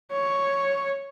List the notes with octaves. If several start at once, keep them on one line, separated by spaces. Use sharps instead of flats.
C#5